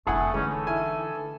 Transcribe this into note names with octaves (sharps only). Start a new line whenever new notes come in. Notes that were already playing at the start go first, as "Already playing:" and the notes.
F1 D3 A3 E4 G#4 F#5
D3 E3 G#3 A3 C#4 D#4
A4
E4 G#5